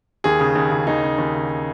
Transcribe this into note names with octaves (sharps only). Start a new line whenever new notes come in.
D#2 G#4
C#3
D#2
C#3
D#2 D#4
C#3
D#2
C#3